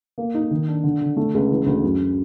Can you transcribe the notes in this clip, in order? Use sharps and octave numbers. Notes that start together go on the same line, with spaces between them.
A#3
D#4
D#3
D4
D3
D3
A3
C#2
E3
D2
F#2